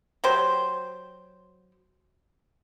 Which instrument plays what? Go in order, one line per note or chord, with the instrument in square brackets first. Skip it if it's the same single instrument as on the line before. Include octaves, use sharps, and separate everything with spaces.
[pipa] F#3 G4 C5